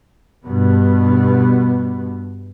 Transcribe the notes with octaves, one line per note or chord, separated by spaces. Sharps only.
G2 B2 B3